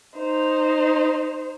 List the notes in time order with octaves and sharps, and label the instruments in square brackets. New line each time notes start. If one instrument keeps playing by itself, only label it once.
[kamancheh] D#4 C5